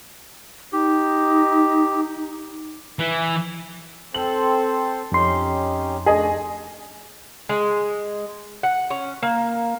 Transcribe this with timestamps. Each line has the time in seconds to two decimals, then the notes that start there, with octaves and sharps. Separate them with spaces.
0.72 D#4 G4
2.99 E3
4.14 C4 A4 C5 F#7
5.12 F2 C#4 D#4 G4 C6
6.06 A3 D4 G#4 D#5 G#5
7.49 G#3
8.63 F#5
8.90 C#4
9.23 A#3